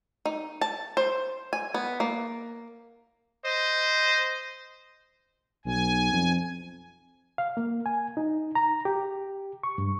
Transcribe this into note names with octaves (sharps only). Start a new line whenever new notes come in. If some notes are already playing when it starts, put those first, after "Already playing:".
D#4
A5
C5
G#5
B3
A#3
C5 D#5
B1 G#5
F2
F5
A#3
G#5
D#4
A#5
G4
C#6
G2